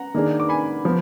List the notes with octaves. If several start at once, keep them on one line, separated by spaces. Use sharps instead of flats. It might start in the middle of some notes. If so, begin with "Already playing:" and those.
Already playing: F#5 A#5
D#3 A#3 D4 G#4
D6
G#5 B5
F3 B3